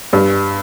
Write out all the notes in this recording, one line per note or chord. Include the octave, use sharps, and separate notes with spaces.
G2